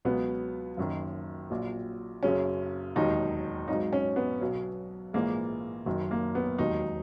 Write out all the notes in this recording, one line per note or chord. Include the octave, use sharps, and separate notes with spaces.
C#2 B2 F#3 B3
F#1 F#2 D#3 F#3
A#1 A#2 F#3
F#1 F#2 C#3 F#3 C#4
E1 D#2 D#3 F#3 D#4
G#1 G#2 F#3 D#4
C#4
B3
B1 B2 F#3
A#1 G#2 E3 G#3 A#3
F#1 F#2 D#3 F#3
A#3
B3
E1 D#2 D#3 F#3 D#4